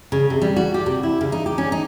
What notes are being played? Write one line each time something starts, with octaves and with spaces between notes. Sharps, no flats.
C#3
C3
G3
F#4
G4
C3
E4
C#3
D#4
G4
C#4
D#4